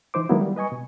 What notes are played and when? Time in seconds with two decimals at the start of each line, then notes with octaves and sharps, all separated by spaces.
0.14 E3 D#4 C5 D6
0.29 D#3 F#3 G#3 A#3 B3 E4
0.41 G3
0.56 B4 D#5 G#5 C#6
0.72 B2